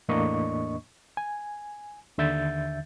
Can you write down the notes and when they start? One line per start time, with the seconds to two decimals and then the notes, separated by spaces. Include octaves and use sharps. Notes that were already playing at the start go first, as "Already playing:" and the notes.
0.09 E2 A2 A#3 D4 D#5 C#6
1.17 G#5
2.18 D#2 D3 E5 G6 A6